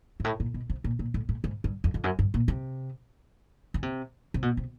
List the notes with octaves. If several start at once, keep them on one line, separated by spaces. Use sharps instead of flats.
G#2
A2
A#2
B2
C3
A#2
A#2
A2
A2
G#2
G2
F2
F2
F#2
G2
A#2
C3
C#3
C3
C3
B2
C3